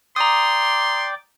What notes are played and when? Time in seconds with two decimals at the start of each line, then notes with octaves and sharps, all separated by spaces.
0.16 D5 G5 A#5 C6 D6 D#6